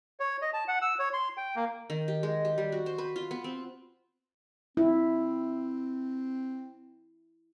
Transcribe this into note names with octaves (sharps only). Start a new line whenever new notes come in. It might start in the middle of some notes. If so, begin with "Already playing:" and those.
C#5
D#5
A5
F#5
E6
C#5
C6
G5
A#3
D#3
G4
G#3
G4
G3
F#4
C5
B4
F4
B3
C4
C4 E4